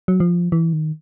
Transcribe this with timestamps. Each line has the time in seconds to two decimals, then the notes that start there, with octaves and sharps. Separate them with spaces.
0.08 F#3
0.20 F3
0.52 E3
0.73 D#3